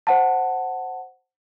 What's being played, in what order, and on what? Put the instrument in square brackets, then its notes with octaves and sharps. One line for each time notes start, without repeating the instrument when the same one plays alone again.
[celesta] C5 F#5 A5